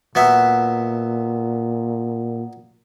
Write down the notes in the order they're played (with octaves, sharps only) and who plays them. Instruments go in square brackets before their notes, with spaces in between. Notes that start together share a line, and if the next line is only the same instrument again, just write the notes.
[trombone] A#2 [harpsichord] F#3 B3 E5